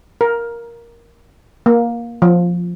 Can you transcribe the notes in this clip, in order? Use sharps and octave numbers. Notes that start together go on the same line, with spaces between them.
A#4
A#3
F3